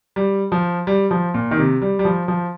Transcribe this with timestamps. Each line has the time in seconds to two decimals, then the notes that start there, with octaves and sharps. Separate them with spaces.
0.16 G3
0.52 F3
0.87 G3
1.11 F3
1.34 A#2
1.51 D#3
1.58 C3
1.82 G3
1.99 G3
2.05 F3
2.28 F3